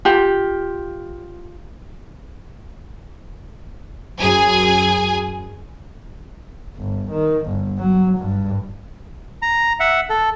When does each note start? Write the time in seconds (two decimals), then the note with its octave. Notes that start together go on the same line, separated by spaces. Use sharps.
0.05 F4 G4
4.19 F#2 G#4 G#5
6.77 G1
7.12 D#3
7.46 G1
7.78 F#3
8.18 G2
9.42 A#5
9.80 E5 F#5
10.10 A4